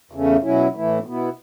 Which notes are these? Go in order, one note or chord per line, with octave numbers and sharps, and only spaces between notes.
E2 C#3 A3 C#4
B2 F#3 C#4 E4
A2 E3 A3 E4
B2 B3 E4